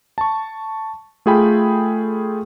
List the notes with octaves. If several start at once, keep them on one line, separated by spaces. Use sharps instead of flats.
A5 C#6
A3 F4 G#4 A4 G5 B5